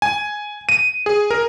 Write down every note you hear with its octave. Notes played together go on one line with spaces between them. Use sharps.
G#5
D#7
G#4
A#4